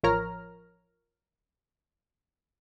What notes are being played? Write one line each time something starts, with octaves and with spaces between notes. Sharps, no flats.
A1 F3 A#4 C#5 A#5 F6